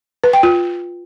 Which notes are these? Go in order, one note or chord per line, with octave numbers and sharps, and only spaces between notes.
B4
G5
F4